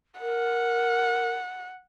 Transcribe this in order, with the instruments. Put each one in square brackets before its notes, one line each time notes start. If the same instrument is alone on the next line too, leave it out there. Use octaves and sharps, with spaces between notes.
[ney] A#4 [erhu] F#5